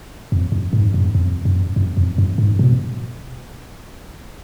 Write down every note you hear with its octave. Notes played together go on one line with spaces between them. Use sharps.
F2
F#2
G#2
F#2
F2
F#2
F#2
F2
F#2
G#2
B2